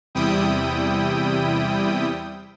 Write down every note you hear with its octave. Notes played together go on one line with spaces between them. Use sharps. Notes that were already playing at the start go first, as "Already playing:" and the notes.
E2 C3 G3 E4 G5 D#6